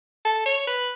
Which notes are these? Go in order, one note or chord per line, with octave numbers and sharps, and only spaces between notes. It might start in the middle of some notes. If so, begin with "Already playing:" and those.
A4
C#5
B4